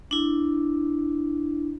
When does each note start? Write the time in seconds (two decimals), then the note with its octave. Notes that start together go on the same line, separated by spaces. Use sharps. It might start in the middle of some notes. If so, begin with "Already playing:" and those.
0.11 D4 E4